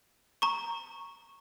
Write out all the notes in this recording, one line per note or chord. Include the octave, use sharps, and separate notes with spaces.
A#5 C#6